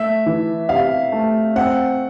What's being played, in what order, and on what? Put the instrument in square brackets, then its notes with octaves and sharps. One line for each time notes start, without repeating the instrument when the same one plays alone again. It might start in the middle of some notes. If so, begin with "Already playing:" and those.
Already playing: [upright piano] A3 [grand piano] E5
[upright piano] E3
[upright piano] C3 [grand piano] F5
[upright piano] A3
[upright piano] C4 [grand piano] F#5